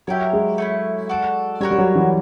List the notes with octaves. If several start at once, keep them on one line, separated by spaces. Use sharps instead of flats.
F#3 E4 G4 A#4 C#5
G#3
A3 C#4 E4
F#4 A4 D5
G3 F#4 A#4 C#5
G3
F#3
E3